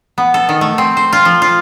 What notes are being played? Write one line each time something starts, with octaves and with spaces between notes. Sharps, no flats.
B3
A4
D#3
A3
C4
C5
F4
F3
F4